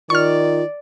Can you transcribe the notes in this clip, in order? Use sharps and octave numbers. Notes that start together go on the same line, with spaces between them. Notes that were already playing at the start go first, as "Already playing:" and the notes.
D#3 F4 D5 C#6 F6